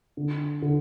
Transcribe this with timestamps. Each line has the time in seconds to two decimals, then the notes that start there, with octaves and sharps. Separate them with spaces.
0.17 D3
0.62 D3